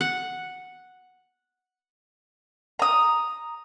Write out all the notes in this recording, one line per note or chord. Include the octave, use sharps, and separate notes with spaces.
F#5
A#5 D#6